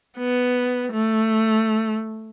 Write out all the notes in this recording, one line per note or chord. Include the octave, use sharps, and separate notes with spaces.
B3
A3